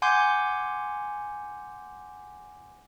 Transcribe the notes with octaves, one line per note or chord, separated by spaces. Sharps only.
F#5 G#5 C6 D6 G6